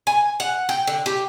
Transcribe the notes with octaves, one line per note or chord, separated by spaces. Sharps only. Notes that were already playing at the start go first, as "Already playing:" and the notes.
G#5
F#5
G5
D3
G4